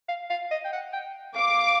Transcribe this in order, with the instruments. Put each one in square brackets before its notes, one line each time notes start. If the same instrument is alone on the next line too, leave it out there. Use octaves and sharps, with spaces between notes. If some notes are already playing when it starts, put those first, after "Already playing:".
[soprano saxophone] F5
F5
D#5
G5
F#5
G5
[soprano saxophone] F5 [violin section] D6